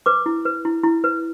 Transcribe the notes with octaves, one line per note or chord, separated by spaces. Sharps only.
B4 D6
E4
B4
E4
E4
B4